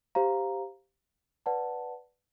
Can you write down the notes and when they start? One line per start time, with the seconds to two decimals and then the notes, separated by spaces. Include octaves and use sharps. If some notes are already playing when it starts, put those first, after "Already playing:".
0.15 G4 C5 F5 A#5
1.46 B4 D5 F#5 A5